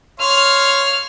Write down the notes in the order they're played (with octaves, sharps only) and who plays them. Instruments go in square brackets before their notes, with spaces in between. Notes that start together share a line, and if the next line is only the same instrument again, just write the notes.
[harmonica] C#5 F5 C6 [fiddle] F6